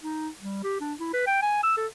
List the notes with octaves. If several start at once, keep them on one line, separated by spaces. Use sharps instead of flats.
D#4
G3
G4
D4
E4
B4
G5
G#5
E6
A4